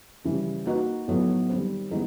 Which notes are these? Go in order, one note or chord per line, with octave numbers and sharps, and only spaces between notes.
C#3 E3 G3
A#3 D#4 F#4 B4
A2 F#3 B3 D#4
D#3 G3 C4
E3 G#3 B3 D#4